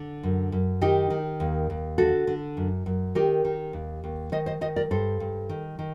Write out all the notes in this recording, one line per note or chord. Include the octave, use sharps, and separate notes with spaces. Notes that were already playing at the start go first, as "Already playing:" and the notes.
Already playing: D3
F#2
F#2
D#3 D#4 G4
D#3
D#2
D#2
D3 F#4 A4
D3
F#2
F#2
D#3 G4 A#4
D#3
D#2
D#2
D#3 C5 D#5
C5 D#5
D#3 C5 D#5
A#4 D5
G2 A4 C5
G2
D#3
D#3